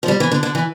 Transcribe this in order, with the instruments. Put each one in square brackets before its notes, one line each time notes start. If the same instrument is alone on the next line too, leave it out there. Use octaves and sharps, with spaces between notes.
[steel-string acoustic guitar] F3
G3
E3
D3
D3
E3